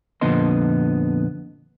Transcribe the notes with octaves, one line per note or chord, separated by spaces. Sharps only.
F2 A#2 D3 B3 D#5 C6